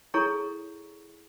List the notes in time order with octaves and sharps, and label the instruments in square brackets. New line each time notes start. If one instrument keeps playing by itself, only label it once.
[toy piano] E4 G#4 A4 C#5 A#5 C#6